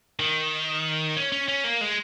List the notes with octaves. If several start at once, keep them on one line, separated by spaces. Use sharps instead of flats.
D#3
C#4
C#4
C#4
A#3
G#3